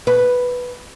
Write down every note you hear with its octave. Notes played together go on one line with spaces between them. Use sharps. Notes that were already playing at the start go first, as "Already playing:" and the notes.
B4